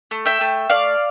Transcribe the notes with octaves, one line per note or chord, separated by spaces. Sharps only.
A3
E5 G5
A3
A3 D5 F5